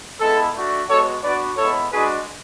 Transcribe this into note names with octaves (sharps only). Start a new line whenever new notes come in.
G#3 B3 E4 A4
A3 D4 F#4
G#3 B3 F#4 A4 C#5
B3 D4 F#4 B4 D5
G#3 B3 E4 A4 C#5
G#3 D4 F#4 G#4 B4